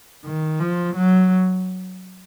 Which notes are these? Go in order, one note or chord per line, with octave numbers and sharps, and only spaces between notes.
D#3
F3
F#3